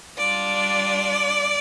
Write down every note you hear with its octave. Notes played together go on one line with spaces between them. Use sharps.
G3 D4 F4 D5